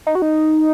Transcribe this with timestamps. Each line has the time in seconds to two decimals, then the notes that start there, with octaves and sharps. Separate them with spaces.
0.07 D#4
0.15 F#4
0.22 D#4